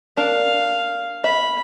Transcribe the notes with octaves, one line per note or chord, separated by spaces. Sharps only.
D4 A#4 F5
E5 B5